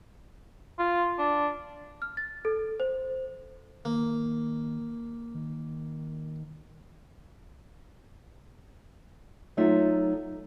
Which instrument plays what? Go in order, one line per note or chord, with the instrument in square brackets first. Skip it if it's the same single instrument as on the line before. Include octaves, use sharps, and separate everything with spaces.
[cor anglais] F4
D4
[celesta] F6
A6
A4
C5
[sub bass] D#3 [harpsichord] A#3
[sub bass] D#3
[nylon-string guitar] F#3 A3 D#4 F4 E5